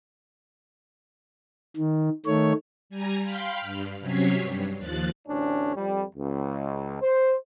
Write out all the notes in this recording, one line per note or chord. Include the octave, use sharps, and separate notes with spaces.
D#3
D#3 A3 C#5
G3 G#5 A#5
F5 G5 B5 C6 F6
G2
C3 F#3 C#4 C#5 B6 C7
G2
D#2 F3 F#6 A6
A1 D2 C#4 D4
F2 G3
C#2
C5